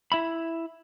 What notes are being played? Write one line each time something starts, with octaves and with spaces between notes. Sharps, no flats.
E4 E5 B5